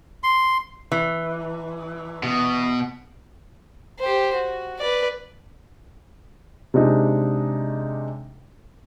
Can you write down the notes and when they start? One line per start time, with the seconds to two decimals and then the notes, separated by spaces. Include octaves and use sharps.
0.23 C6
0.92 E3
2.23 B2
3.99 G4 C5
4.35 F#4
4.79 B4 D5
6.74 C3 G#3 D4 D#4